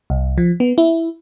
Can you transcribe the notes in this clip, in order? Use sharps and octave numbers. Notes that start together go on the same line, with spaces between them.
C2
F3
B3
E4